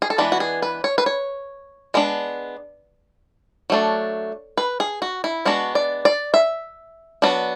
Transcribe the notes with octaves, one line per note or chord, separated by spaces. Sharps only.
G#4
A4
E3 G#3 B3 D4 B4
F#4
G#4
B4
C#5
B4
C#5
G#3 B3 D4
F#3 A3 D4
B4
G#4
F#4
E4
G#3 B3 D4 F#4
D5
D5
E5
F#3 B3 D4